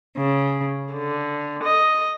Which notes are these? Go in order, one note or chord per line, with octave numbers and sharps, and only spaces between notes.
C#3
D3
D#5